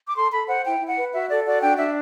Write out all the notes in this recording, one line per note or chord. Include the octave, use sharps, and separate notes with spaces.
D6
A4 C6
A4 B5
C5 F#5
E4 G5
E4
F#5
B4
F#4 E5
A4 D5
F#4 D5
D4 G5
D4 E5